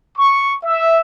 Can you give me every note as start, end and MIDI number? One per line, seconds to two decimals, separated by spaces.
0.18 0.53 85
0.65 0.98 76